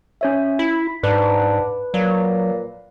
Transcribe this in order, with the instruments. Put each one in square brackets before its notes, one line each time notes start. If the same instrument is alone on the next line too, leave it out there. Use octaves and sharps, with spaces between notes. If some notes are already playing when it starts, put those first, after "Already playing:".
[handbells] C#4 C#5 E5
[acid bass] E4 [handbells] B6
[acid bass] G#2 [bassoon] D4 [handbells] B4
[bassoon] A#2 [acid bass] F#3